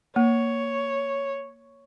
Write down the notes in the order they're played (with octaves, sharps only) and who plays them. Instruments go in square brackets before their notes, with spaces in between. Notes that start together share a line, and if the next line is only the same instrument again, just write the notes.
[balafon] A#3 [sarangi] C#5